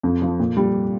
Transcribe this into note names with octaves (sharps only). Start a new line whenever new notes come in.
F2
F3
A#2
G3